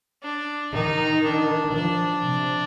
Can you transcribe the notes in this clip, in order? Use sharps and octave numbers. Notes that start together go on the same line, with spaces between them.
D4
D#3 D#4
D4
F3 D4
C3